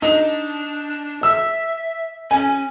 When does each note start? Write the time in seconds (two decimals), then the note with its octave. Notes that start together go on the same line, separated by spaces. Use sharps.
0.02 D4 D#4
1.23 E5 E6
2.31 C#4 G#5